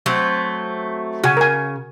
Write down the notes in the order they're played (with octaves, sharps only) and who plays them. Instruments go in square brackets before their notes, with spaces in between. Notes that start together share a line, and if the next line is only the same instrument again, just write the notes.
[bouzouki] F#3 A3 C4
[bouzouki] C#3 [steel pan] F#4 G#5
[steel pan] A#4 G#5